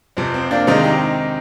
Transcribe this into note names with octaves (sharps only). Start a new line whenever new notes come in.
F2 C3 F3 C4
C4
A#3 D4
C3 D#3 G#3 C4 D#4
D#4 G4